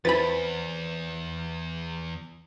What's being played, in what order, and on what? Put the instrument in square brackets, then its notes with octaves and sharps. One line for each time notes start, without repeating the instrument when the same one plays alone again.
[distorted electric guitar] E2 [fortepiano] C4 E4 G#5 [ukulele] B4 [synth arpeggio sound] B5 A6